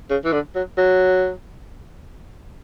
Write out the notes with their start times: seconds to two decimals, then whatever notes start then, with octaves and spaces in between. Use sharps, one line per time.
0.10 C#3
0.25 E3
0.32 D3
0.55 F#3
0.78 F#3